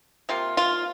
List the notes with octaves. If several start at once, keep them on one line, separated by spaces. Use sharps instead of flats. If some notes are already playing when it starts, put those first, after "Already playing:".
C3 F3 A#3 F4
F4